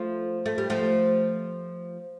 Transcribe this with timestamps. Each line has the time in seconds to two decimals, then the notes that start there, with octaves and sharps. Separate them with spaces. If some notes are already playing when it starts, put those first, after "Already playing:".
Already playing: F3 A3
0.46 A3
0.58 G3
0.70 F3 A3